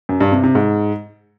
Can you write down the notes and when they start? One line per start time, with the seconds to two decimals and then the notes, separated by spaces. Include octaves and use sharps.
0.09 F#2
0.21 G2
0.32 C3
0.44 C3
0.55 G#2